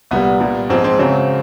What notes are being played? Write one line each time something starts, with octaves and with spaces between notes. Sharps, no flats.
C2 A#2 G3 B3
A#2 G3
G#2 F3 G#3 C4
C4
F#2 C#3 F#3 C4